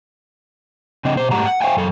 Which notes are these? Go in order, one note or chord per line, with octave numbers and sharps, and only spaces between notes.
C#3 C4 D4 D#5
B2 C5
G#2 A3 G4 F#5 A#5
F#5
C5 D5 E5 F5 G5 G#5
F#2 A4